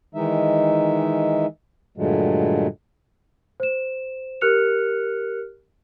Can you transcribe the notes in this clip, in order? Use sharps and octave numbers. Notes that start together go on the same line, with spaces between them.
D#3 E3 G#3 D#4 E5
G2 A#2 D3 F#3 G#3 A3
C5 E7
G4 A#4 F6 F#6 C#7 F7